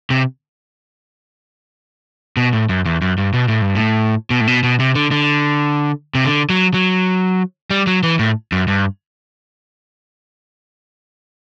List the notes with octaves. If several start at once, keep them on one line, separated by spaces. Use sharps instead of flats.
C3
B2
A2
F#2
E2
F#2
G2
B2
A2
G2
A2
B2
A2
B2
B2
C3
D3
D3
C3
D3
F#3
F#3
G3
F#3
E3
A2
F#2
G2